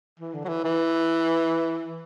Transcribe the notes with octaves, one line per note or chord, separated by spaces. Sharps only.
E3
D3
F#3
E3
E3